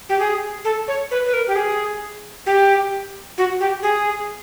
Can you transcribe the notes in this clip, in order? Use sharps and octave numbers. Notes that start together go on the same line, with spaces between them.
G4
G#4
A4
C#5
B4
B4
A#4
G4
G#4
G4
F#4
G4
G#4